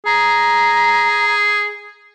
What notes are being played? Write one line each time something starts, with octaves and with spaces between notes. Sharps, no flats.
G#4 A#5